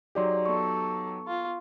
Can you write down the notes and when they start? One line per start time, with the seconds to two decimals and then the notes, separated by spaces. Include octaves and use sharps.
0.15 F#3 D#4 G4 G#4 D5 C6
0.46 B3 A4 C#6
1.27 F4